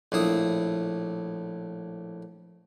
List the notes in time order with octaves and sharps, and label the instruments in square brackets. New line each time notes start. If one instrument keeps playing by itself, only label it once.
[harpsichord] A#1 A2 E4 D#6